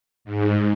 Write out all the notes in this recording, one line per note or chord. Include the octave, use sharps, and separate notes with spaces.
G#2